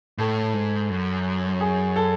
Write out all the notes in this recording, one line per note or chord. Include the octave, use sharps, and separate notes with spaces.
A2 A4
G#2
F#2
G#4
A4